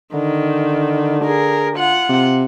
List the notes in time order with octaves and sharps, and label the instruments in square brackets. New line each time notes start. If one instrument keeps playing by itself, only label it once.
[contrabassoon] D3 [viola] D#3
[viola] G#4 A#4
F4 F#5
[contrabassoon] C3